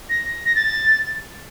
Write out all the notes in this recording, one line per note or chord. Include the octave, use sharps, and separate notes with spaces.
A#6
A#6
A6